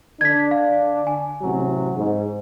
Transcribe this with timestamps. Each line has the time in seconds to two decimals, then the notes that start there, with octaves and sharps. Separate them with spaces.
0.21 D3 D4 G#6 B6
0.51 F5
1.07 G#5
1.42 A1 C3 F#3
1.97 G#2